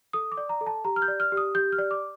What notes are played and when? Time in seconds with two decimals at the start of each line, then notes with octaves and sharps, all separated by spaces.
0.13 A4 D#6
0.32 D6
0.37 D5
0.49 A#5
0.61 A4
0.67 A5
0.85 G4 A#5
0.96 F6
1.02 G6
1.08 D5
1.20 F6
1.32 G4
1.37 D#6
1.55 G4 G6
1.72 F6
1.79 D5
1.91 D6